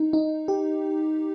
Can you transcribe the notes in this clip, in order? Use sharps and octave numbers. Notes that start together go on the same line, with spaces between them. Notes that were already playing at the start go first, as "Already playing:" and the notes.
Already playing: D#4
D#4
G4